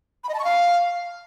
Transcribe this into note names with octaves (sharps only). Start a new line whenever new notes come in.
B5
D#5
A5
C#6
F5